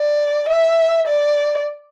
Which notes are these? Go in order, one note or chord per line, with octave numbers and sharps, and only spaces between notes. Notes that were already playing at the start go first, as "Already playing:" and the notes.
Already playing: D5
E5
D5